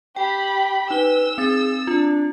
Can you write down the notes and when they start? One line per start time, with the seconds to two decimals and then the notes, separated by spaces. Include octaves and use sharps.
0.16 G4 G5 B5
0.91 D#4 B4 E6 G7
1.38 C4 G#4 A6
1.87 D4 F4